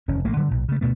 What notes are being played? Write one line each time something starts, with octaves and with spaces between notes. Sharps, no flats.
F1 D#2 C#4
A1 A3 A#3
D3 F#3 G3
B1 A#2
C#3 A3
D2 B2 A3 B3